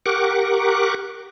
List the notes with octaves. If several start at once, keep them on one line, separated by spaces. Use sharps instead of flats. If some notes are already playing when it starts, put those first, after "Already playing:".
G4 A#4 F#5 C#6 D6